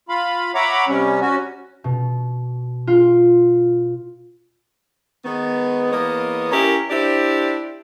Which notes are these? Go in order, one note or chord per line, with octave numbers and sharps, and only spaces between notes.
F4 F5 B5
C#5 E5 F#5 A#5 B5 D6
C3 G3 C#4
C#4 F#4
B2
F4
D#3 G#3 B3
E2 A#3 B3 C#5 D#5
C#4 E4 G4 A#4
D4 E4 G4 C5 D5